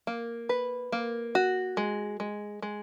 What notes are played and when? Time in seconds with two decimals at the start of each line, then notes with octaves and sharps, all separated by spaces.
0.07 A#3
0.49 B4
0.92 A#3
1.35 F#4
1.77 G#3
2.20 G#3
2.62 G#3